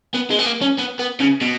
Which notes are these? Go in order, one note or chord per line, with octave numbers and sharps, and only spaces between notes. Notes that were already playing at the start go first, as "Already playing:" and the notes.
B3
G#3
B3
A#3
C#4
B3
B3
C#3
B2